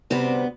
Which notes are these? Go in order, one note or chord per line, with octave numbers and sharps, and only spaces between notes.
D2 C3 G3 B3 C4